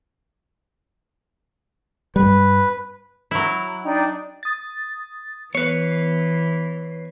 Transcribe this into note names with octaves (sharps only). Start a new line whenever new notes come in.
G2 G3 B4
F#3 E4
D4 D#4 G5
D#6 A6
E3 B3 B4 C#5 C7